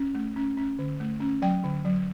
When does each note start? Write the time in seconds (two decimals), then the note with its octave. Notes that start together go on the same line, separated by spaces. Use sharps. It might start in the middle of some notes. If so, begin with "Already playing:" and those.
Already playing: C#4
0.15 A3
0.36 C#4
0.57 C#4
0.79 D3
1.00 A3
1.20 C#4
1.42 F#3 G5
1.64 D3
1.85 F#3